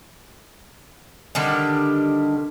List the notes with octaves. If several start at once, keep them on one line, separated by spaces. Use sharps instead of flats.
D3 D#3 G3